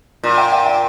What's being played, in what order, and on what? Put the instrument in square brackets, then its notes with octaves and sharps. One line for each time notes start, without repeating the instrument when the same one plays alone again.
[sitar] A#2
[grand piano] G5
G5
G5